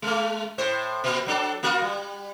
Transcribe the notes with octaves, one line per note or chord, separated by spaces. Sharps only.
G#3 A3
A2 C5
A#2
F#3 D4 A4
A#3 F4 F#4
G3